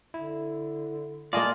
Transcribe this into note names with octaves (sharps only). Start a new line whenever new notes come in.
D3 E4
A#3 F4 D5 D#5 G#5 A5